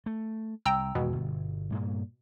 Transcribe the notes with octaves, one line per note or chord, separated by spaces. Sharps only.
A3
C2 G5 A#5 E6
G#1 E2 B2 G#3
G1
G2 A#2 A#3